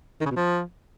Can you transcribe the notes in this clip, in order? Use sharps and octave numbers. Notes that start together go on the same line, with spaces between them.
D#3
C#3
B2
F3